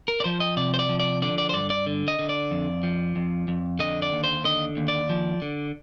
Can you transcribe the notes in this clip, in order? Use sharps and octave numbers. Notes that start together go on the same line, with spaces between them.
A#4
D5
F3 C5
D#5
C3 D5
C5
D5
F3
D5
D3 D5
D5
C5
G2 D5
D5
D3
D#5
D3
D5
F2
F3
F2
F2
D3 D#5
D5
D#2
C5
D3 D#5
D#2
D5
F3
D3